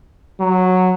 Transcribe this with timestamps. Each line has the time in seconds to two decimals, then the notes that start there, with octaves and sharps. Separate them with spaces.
0.40 F#3